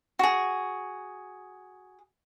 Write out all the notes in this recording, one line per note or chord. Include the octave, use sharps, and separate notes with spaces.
F#4 G#4